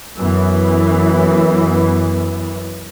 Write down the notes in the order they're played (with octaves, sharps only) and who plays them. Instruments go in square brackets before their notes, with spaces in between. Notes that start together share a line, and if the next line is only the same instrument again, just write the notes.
[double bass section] F#2 E3 B3